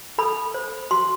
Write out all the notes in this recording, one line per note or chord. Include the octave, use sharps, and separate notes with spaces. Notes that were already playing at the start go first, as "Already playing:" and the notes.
A4 B5
C5
F#4 C6